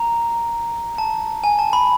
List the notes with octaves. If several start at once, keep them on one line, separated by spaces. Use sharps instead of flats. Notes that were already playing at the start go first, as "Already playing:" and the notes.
Already playing: A#5
A5
G#5
A5
B5